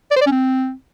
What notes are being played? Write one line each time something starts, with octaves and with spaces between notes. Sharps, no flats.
D5
C5
D5
C#4
C4